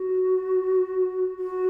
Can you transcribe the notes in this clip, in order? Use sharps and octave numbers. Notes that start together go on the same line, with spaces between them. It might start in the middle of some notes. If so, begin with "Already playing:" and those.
Already playing: F#4
F#4